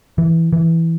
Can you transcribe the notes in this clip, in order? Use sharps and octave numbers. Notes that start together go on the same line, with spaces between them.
E3
E3